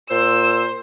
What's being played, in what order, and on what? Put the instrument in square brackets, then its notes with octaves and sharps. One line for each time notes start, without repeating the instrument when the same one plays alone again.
[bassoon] A#2 [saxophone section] C5 [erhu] E6